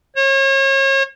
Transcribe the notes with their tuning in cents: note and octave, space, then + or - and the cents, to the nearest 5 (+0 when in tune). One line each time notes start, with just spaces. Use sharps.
C#5 -35